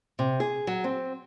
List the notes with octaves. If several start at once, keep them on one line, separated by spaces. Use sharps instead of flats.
C3
G#4
F#3
C4